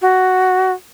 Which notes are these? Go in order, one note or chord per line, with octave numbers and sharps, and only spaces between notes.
F#4